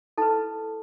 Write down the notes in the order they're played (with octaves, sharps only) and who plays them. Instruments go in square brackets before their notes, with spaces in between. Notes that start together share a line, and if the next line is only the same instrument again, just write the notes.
[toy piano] E4 A4 B4 A5